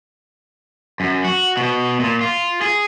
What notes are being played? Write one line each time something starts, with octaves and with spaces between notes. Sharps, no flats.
F#2
F#4
B2
A#2
F4
G#4